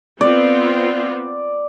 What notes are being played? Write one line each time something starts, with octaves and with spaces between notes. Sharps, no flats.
B3 C4 F4 D5